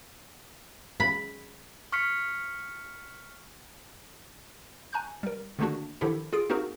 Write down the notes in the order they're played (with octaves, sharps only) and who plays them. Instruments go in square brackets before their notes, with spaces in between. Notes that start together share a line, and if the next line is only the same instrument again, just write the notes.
[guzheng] B5
[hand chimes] C#6 F6 B6 C#7
[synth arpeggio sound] G#5 A#5 C#6 F#6 G6
G3 A#4
D3 D#3 A3 A#3 D4 F#4
D3 D#3 F3 E4 G4 A4
F4 G#4 D7
A#3 C4 D#4 F#4 G#4 A#4